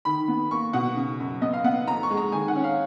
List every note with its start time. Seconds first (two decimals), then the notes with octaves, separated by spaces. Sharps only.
0.05 D#3 B5
0.28 B3
0.51 A#3 C#6
0.73 B2 F#5
0.96 C#3
1.20 F#2
1.42 B3 D#5
1.53 F5
1.64 B3 F#5
1.87 F2 A#5
2.03 C#6
2.11 G#3
2.17 A#5
2.32 D#3 G#5
2.48 F#5
2.55 C#4
2.64 F5